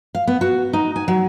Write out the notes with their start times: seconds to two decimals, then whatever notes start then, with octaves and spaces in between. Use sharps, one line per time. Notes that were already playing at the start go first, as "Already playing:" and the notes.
0.15 F5
0.27 B3
0.41 F#4
0.73 D#4
0.96 G#5
1.08 F#3